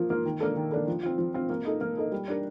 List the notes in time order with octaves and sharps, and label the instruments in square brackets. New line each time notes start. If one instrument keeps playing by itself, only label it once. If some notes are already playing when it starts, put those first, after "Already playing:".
Already playing: [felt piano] F3 A#3 F4
A#3 F4
D#3
A#3 D4 A4
D#3
A#3 D4 A4
F3
C4 F4
F3
C4 F4
A#3
D#4 A4 D#5
A#3
D#4 A4 D#5
G3
D4 G4 A#4